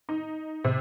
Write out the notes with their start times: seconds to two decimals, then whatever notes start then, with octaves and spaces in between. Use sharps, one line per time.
0.09 D#4
0.64 C3